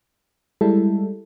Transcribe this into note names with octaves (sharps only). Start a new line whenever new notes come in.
G3 G#3 E4 A4